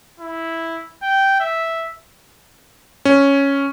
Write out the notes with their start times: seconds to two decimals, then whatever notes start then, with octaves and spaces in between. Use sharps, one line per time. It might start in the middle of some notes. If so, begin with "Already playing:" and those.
0.20 E4
1.02 G5
1.40 E5
3.05 C#4